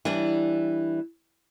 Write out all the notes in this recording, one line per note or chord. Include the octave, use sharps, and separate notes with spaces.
E3 G3 D4